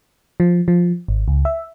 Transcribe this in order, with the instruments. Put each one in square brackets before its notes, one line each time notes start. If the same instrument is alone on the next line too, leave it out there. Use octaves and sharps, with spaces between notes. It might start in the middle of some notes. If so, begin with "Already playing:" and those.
[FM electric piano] F3
F3
G#1
C#2
E5